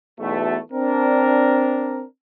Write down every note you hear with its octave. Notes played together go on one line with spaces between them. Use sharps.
B1 E2 B2 A3
C4 D4 A#4